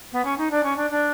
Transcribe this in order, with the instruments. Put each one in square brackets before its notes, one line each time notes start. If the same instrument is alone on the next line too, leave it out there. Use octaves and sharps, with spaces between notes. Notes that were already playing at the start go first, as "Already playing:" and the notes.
[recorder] B3
C#4
D#4
D4
C#4
D4
D4